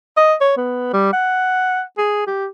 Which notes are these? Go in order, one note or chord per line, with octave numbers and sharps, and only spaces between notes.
D#5
C#5
B3
G3
F#5
G#4
G4